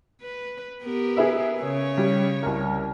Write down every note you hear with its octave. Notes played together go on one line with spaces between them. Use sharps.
B4
B3 G4 A#4
G#4 B4 E5
C#3 C#5
G3
C2 A#4